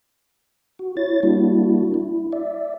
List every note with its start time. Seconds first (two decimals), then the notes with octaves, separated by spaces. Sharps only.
0.79 F#4
0.97 E4 C#5 A6
1.23 G3 A#3 D4 E4 F#4
1.94 E4
2.33 D5 E5